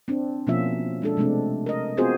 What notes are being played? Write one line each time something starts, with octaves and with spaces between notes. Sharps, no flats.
C4 D4
B2 F3 A#3 C#4 F4 E5
G#3 D4 A4
C3 G#3 A3 C4 D4
A#4 D#5
B3 C4 F4 F#4 G#4 C5